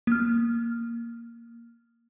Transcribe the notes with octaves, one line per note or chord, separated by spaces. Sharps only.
A#3 F6